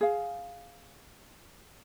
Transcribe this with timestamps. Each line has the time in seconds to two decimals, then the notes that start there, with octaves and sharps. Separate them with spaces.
0.01 G#4 F5